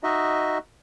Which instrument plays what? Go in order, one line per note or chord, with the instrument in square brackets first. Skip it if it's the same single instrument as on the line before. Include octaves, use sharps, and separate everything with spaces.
[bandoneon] D#4 F#4 D#5 E5